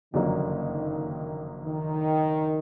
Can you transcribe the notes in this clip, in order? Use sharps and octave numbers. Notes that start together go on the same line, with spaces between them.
F#1 F2 D3 D#3 F#3 A#3
D#3
D#3